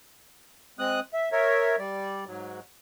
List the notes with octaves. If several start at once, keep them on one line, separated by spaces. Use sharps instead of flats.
G#3 C4 D#6 F#6
E5
A#4 C#5 E5
G3 D5
G#2 F#3